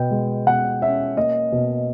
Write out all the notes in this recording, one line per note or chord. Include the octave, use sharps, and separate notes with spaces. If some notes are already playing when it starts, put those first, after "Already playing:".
Already playing: B2 G5
G#3
B2 F#5
C#4 E5
A#3 D#5
B2